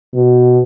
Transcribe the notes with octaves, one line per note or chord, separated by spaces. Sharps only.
B2